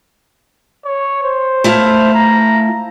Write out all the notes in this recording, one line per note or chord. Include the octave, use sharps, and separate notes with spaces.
C#5
C5
A3 E4 F5
A#5